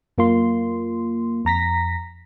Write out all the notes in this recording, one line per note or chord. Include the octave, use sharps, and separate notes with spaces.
F#2 A#3 F4 C6
F2 A#5 A#6 B6